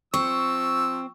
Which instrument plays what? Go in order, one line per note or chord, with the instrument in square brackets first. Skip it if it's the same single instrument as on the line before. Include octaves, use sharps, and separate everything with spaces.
[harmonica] F3 E6 [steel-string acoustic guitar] C4 [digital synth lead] C#6